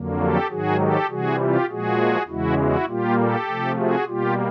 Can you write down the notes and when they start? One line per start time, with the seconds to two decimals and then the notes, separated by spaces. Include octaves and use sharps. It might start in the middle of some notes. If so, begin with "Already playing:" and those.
Already playing: F2 D3 F#3 A#3
0.20 G4 A4
0.50 G#2 D#3 F#3 F#4 G#4
0.80 G4 A4
1.09 C3 E3 G3 F#4 G#4
1.39 F4 G4
1.68 A#2 F3 G#3 F#4 G#4
2.28 E2 C#3 E3 G#3 E4 F#4
2.58 E4 F#4
2.88 A#2 G3 A#3 F4 G4
3.18 G4 A4
3.48 C3 F3 A3
3.77 F#4 G#4
4.07 B2 G3 A#3 F4 G4